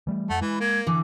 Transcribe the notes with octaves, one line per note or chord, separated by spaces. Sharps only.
E3 G3 A3
F2 A3 F#5
E3 G#3 B5
A#3 G#6
D3 E3 D6